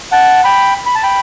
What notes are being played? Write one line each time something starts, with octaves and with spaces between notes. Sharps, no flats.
F#5 A5
G5 B5
B5
A5
G5 B5